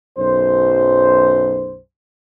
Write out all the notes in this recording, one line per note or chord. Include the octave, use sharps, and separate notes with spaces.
B1 F#2 C5